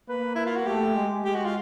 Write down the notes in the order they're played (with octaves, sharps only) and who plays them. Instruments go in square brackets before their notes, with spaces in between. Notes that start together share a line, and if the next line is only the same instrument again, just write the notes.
[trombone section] A#3 [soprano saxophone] B4
[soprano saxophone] E4
F4
F#4
[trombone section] A3 [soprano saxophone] G4
[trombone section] G#3
[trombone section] G#3 [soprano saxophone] G4
[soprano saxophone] F#4
F4